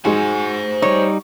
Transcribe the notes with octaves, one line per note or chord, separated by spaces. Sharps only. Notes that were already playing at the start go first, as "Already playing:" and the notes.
G#2 G#3 F#4 C5 G#5
G3 D#4 C#5